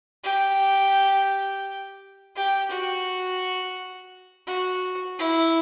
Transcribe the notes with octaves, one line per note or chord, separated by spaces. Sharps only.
G4
G4
F#4
F#4
E4